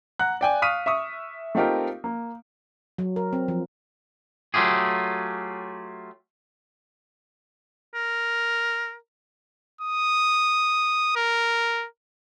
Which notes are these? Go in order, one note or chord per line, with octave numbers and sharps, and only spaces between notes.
F#5 A#5 F#6
D5 G5 G#5
F5 C#6 D#6 F6 B6 D#7
E5 C#6 D#6
A3 C4 D#4 F4 G4 A#4
A#3
F#3
A#4
C4
F3
F#3 A3 F4 G4 G#4
A#4
D#6
A#4